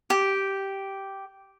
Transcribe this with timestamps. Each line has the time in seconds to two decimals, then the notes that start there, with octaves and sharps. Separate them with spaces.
0.10 G4